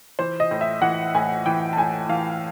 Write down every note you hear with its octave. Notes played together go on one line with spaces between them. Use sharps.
E3 C5
D#5
A2
E5
E3 F#5
A2 G#5
E3 G5
A5
A2 G#5
E3 F5